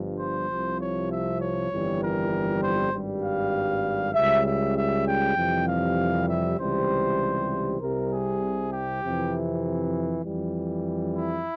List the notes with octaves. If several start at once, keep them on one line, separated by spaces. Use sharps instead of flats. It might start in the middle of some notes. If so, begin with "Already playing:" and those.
Already playing: G1 G2 F3
C5
C2 C3 F3
C#5
E5
C#5
G1 F2 E3 G3
A#4
C5
G#1 G2 G3
F5
C#2 C#3 G3 E5
E5
E5
G5
F2 C3 E3 G3
F5
E5
C#2 C3 E3 G3 C5
C2 C3 G3 A#4
G#4
G4
F2 C3 E3
F2 E3 G3
E4